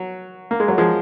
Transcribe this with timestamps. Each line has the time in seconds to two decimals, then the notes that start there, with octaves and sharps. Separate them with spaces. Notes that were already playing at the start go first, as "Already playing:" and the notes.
Already playing: F#3
0.51 A#3
0.60 G#3
0.68 F#3
0.78 F3 G#3